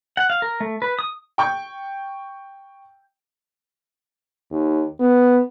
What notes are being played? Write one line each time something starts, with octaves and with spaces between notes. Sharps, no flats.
F#5
F5
A#4
A3
B4
D#6
G5 C#6 G6
D#2
B3